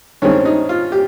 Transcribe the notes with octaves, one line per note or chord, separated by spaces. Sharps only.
G2 D#3 G#3 C4 C#4
D#4
F4
G4